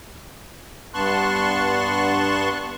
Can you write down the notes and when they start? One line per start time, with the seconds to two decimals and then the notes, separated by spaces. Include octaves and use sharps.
0.94 G2 B3 A5 C6 C#6 F#6